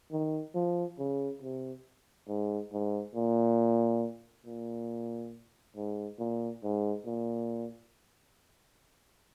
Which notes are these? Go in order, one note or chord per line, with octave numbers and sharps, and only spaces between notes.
D#3
F3
C#3
C3
G#2
G#2
A#2
A#2
G#2
A#2
G#2
A#2